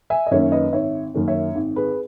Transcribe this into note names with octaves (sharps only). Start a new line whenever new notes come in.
E5 G#5
D#5
F#2 D#3 A#3 C#4 C#5 E5
B4 D#5
G#1 C#5 E5
F#2 D#3 A#3 C#4
C#5 E5
G#1
G#4 B4